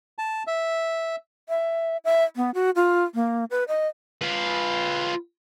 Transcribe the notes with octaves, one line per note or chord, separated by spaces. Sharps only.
A5
E5
E5
E5
B3
F#4
F4
A#3
B4
D#5
F4 B4